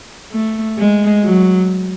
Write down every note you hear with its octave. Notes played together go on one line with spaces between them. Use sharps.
A3
G#3
F#3